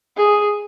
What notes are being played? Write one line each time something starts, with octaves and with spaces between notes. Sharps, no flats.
G#4